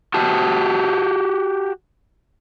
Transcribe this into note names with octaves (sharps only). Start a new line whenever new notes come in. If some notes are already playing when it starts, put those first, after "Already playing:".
F#4 G4 A5